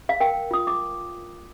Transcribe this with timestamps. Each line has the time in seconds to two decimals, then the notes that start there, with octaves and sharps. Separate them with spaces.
0.09 F5
0.20 A#4 G5
0.51 F4 D#6
0.67 D6